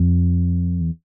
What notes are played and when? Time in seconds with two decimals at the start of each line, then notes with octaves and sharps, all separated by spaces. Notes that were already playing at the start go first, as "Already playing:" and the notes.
Already playing: F2
0.81 E2